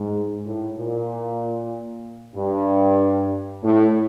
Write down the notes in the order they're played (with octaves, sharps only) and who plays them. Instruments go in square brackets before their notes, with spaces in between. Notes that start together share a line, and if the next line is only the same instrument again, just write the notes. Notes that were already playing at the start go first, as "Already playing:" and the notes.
Already playing: [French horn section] G#2
A2
A#2
G2
A2